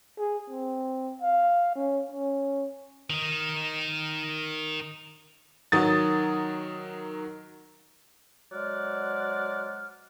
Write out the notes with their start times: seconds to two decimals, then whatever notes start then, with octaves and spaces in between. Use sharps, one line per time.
0.18 G#4
0.50 C4
1.22 F5
1.75 C#4
2.12 C#4
3.10 D#3 D#4
5.72 D#3 F#3 D#6 A6
8.52 F#3 G#3 C5 D5 F#5 F6